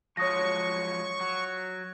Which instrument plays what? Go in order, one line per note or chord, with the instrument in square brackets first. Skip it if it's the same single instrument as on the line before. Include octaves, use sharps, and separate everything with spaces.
[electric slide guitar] F3 F#3 G#3 [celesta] C#5 D#6 A#6 [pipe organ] C#6
[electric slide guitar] F#3